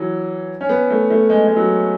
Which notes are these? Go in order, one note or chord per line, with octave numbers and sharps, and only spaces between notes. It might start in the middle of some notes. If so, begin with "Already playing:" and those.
Already playing: E3 F#3
C#4
B3
A3
A3
G#3
G#3
F#3